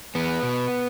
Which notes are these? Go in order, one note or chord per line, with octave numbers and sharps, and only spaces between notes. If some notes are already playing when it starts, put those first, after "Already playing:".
E2 B3
B2